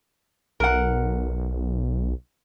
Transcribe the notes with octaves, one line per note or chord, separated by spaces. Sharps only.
B1 A#4 F#5